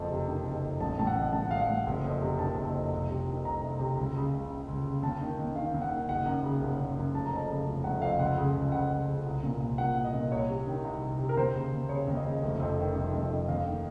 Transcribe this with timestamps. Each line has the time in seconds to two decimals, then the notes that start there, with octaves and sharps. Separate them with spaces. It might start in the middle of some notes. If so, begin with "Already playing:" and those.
Already playing: F#1 F2 A5
0.10 C3
0.28 D#3
0.46 F#1
0.63 F2
0.80 A1 A5
0.98 A2 A5
1.07 F#5
1.15 A1
1.33 A2 A5
1.42 F#5
1.51 A1 F5
1.60 F#5
1.68 A2
1.86 F#1
2.04 F2
2.21 C3
2.39 D#3 A5
2.56 F#1
2.74 F2
2.92 C2
3.09 C3
3.27 D#3
3.45 C2 A#5
3.63 C2
3.79 C3
3.97 C#2
4.16 C#3
4.33 C#2
4.50 C#3
4.68 C#2
4.86 C#3
5.02 D#2 A5
5.21 D#3
5.38 D#2
5.56 D#3 F5
5.74 D#2
5.82 F#5
5.91 D#3
6.08 F#1 F#5
6.26 F#2
6.44 C#3
6.61 F#1
6.80 F#1
6.96 F#2
7.14 F1 A5
7.26 A#5
7.32 F2 A5
7.50 C#3
7.68 F1
7.84 F1 F#5
8.02 F2 F5
8.19 C#2 F#5
8.38 C#3
8.56 C#2
8.72 C#3 F#5
8.90 C#2
9.08 C#3
9.26 C2
9.43 A#2
9.60 C2
9.78 A#2 F#5
9.96 C2
10.05 D#5
10.14 A#2
10.31 C2 C#5
10.49 C3
10.67 D#3
10.84 C2
11.02 C2
11.19 C3
11.29 A#4
11.36 D#2 C5
11.54 C#3
11.72 D#2
11.89 C#3 C#5
12.07 D#2
12.16 D#5
12.25 C#3
12.43 F1
12.60 F2
12.78 D#3
12.96 F1
13.13 F1
13.31 F2
13.49 D#2 F5
13.65 D#3